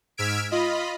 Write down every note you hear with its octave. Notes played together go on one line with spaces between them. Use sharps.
G#2 E6 F6 G#6 B6 D7
F4 D#5 B5